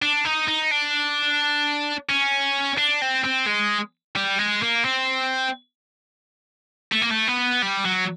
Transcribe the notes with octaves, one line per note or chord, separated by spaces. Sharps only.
D4
D#4
D#4
D4
C#4
D4
C4
C4
G#3
G3
G#3
A#3
C4
A3
A#3
A3
B3
G3
F#3